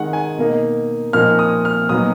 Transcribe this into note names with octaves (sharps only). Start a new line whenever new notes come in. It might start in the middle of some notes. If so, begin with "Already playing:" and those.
Already playing: D#3 G#3 D#4 F#5
G#5
B2 A#3 D#4
A#2 F3 A#3 D#4 F6
D#6
F6
A#2 F#3 B3 D#4 D#6